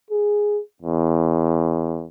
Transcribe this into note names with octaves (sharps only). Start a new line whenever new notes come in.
G#4
E2